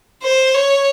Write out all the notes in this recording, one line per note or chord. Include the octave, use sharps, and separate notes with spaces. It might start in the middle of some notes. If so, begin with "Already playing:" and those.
C5
C#5